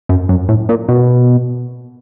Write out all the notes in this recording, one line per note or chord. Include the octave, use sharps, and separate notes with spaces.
F#2
F#2
A2
A#2
B2